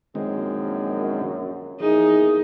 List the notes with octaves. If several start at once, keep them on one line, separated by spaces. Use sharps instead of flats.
A#1 F#2 D#3 G#3 C4
E2 E3 F3 A#3 D#4 G#4